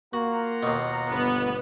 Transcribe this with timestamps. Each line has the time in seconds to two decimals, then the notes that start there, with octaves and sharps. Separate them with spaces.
0.13 A#3 F4 F#4 F#5 A#5
0.63 D#2 B2
1.09 G1 B3